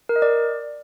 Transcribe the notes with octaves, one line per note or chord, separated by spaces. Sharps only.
A#4
D#5
D5